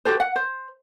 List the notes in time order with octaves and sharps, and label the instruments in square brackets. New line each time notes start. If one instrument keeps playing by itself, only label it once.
[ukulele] F#4 G4 A4 C5
F#5
C5